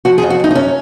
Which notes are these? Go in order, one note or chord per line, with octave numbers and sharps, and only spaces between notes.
F3 F#4
G#4
F2
F#4
F2 D#4
D#4
F#2 C#4